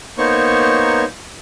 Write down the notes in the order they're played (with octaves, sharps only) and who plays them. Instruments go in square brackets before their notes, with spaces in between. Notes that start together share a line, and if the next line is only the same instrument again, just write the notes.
[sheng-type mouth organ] A#3 B3 D#4 C5 C#5 C#6